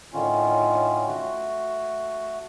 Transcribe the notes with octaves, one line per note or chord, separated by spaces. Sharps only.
A2 D3 D#3 C#4 F4
A3 F#4